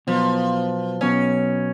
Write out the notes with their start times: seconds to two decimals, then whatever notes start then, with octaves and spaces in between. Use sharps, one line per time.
0.07 B2 F3 F#3 B3
1.01 B2 F#3 B3 C#4